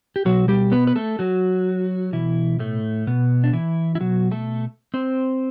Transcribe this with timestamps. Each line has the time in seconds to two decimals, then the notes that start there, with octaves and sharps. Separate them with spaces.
0.16 G4
0.25 B2 F#3 F#4
0.48 G3 G4
0.72 B3 B4
0.87 B4
0.96 A3 A4
1.19 F#3 F#4
2.12 B2 E3 E4
2.59 A2 A3
3.07 B2 B3
3.44 D4
3.53 E3 E4
3.95 E4
4.00 B2 F#3 F#4
4.31 A3 A4
4.94 C4 C5